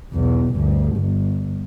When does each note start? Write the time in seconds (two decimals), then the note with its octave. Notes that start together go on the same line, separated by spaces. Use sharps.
0.13 B1 E2
0.53 D2 G2
0.97 G1